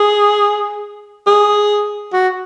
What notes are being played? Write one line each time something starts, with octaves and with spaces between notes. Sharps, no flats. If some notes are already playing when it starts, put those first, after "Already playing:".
Already playing: G#4
G#4
F#4